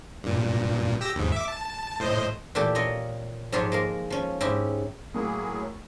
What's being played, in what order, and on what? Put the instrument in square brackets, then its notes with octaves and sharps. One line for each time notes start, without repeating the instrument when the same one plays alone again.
[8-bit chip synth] G2 A#2
G4 E6 A#6
D#2 G#2
E5 D6
A5
A2 C5 D#5
[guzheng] A#2 E3 A3 G4 A4
F4 A#4 C#5 D#5
G#2 F3 F#3 F4 G4 C#5
G#3 A#3 A#4
F3 C#4
G#2 C#4 E4 G4
[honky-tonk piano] A2 A#4 [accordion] F#3 A#3 G#4